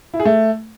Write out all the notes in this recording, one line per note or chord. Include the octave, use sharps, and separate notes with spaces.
E4
G#4
A3